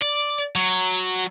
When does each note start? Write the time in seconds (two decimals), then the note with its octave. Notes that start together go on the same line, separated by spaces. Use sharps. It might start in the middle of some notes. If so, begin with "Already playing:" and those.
0.02 D5
0.55 F#3